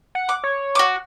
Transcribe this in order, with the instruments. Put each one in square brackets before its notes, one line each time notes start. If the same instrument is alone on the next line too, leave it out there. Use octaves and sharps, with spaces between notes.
[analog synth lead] F#5
[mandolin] D6
[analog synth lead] C#5
[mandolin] F#4 D6